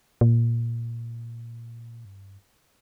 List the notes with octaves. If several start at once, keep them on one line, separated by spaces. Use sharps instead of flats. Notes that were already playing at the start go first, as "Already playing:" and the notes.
A#2
G2